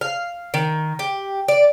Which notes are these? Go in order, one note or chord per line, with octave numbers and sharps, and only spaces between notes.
F5
D#3
G4
D5